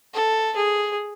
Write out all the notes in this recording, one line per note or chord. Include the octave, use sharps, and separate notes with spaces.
A4
G#4